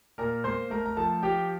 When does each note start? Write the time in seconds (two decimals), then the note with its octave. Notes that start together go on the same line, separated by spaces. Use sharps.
0.18 A#2 A#4 A#5
0.44 A#3 C5 C6
0.70 A3 A#4 A#5
0.86 A#5
0.97 F3 A4 A5
1.23 F3 G4 G5